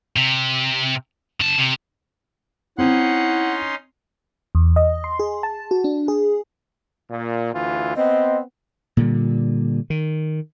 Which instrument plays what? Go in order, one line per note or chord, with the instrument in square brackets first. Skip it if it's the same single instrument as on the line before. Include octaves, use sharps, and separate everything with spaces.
[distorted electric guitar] C3
C#3 A5
C3
[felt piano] C4 [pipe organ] C#4 D#4 C6 [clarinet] E4 [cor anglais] F#5
[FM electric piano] E2
D#5
C6
G#4
A5
F#4
D4
G#4
[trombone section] A#2
D2 E3 F4
[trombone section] B3 C4 [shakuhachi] D#5
[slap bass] A#2 D3 G3
D#3